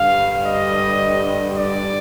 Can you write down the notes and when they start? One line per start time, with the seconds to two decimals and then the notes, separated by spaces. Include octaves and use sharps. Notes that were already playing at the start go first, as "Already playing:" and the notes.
Already playing: G2 D3 G3 F5
0.46 D#5
1.57 D5